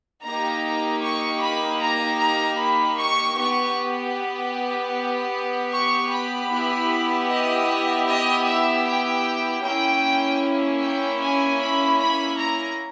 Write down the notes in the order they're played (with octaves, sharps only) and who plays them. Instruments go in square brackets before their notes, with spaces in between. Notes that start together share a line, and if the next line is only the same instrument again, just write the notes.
[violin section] A#3 D#4 G4 A#5
C#6
B5
A#5
A#5
B5
C#6
B3 G4 C#6
C#6
B5
B3 E4 G4
D#5
D#5
E5
G5
A#3 C#4 E4 G5
G5
G#5
B5
B5
A#5